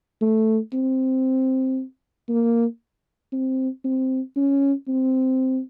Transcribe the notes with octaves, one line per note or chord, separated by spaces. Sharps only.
A3
C4
A#3
C4
C4
C#4
C4